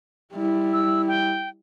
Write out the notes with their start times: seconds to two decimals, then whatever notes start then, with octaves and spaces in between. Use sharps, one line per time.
0.34 G3 E4
0.73 E6
1.08 G5